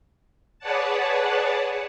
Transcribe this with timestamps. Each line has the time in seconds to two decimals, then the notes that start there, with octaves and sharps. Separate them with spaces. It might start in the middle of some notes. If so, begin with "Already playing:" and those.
0.59 G#4 B4 C#5 D5 F#5 A5